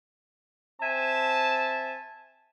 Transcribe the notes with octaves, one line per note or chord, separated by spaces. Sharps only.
C4 E5 G#5 A5